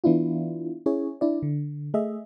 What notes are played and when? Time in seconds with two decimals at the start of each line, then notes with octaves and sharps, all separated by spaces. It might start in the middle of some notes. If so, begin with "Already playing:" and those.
0.04 E3 B3 D4 E4 F4
0.86 C#4 E4 G#4 C#5
1.21 D4 E4 D5
1.43 D3
1.94 A3 G#4 D#5 E5